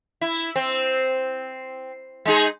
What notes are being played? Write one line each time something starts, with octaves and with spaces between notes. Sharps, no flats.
E4
C4
G#3 D#4 G#4